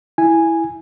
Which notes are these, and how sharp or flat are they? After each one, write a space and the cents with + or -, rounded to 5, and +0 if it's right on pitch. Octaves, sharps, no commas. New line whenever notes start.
E4 +0 G#5 -5